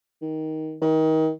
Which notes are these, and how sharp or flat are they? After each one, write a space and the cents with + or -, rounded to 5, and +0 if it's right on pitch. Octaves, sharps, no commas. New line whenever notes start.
D#3 +15
D#3 +30